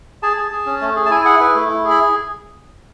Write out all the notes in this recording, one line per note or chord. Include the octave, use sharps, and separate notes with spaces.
G#4 A5
G#4
G#4
C#4
A3
G#4
A5
E4 G#5
G#4 F#5
E4 B4
A3
E4
G#4
B5